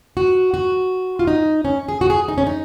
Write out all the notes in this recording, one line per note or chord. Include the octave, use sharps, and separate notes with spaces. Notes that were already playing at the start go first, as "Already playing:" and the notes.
F#4
F#4
F4
D#4
C#4
G#4
F#4
G#4
D#4
C#4
D#4